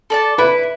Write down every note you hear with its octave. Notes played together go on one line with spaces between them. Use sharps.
A4 D5 A5
E4 B4